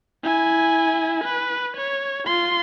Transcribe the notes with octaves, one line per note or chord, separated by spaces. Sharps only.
E4 G#5
B4
C#5
F4 C6